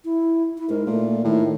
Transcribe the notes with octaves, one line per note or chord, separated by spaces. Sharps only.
E4
E4
G#2 A#4
A#2 A3
A2 D#3